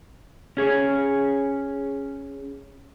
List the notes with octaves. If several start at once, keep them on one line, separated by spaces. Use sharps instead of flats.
C#4 G#4 C#5